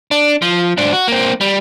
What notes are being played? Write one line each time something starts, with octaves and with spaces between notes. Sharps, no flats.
D4
F3
G#2 D4
F#4
A#3 C4
G3